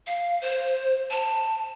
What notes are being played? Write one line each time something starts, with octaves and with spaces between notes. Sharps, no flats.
F5
C5
A5